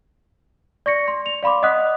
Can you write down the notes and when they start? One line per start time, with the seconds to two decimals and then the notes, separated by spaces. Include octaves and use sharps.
0.86 D5 C#6 A#6 C#7
1.08 C6
1.26 F7
1.43 D5 F5 B5 C6 D6
1.63 D#5 F#5 D#6 F#6 B6